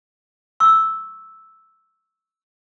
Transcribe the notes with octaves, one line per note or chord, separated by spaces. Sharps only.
C#6 E6